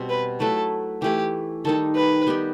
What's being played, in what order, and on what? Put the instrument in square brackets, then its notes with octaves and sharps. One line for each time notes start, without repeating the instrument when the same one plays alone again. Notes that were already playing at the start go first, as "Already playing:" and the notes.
Already playing: [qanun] B2 G3 C4 F#4
[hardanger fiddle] B4
[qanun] F#3 A3 E4 B4 [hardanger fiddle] A4
[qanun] E3 A3 E4 [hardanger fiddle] G4
[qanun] D#3 G3 D#4 [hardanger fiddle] A4
[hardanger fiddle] B4
[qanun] G3 B3 D#4 G4